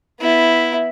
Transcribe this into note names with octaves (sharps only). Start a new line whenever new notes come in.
B3 E4